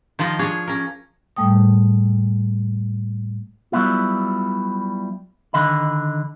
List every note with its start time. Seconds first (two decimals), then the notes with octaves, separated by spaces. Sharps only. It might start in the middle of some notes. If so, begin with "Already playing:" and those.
0.19 D#3 F3 F4 D#5
0.39 D4 G#4 C#5
0.67 C#4 A#4
1.36 A2 G3 A3 G5 D#6
3.72 F#3 G3 B3 E4 F4
5.53 D3 D#3 D#5 B5